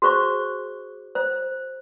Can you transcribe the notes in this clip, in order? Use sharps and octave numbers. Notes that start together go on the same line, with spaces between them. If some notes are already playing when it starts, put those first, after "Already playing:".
F#4 G#4 C5 C#6
C5